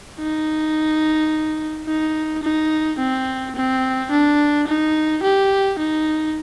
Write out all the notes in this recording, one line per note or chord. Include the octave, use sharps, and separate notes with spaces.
D#4
D#4
D#4
C4
C4
D4
D#4
G4
D#4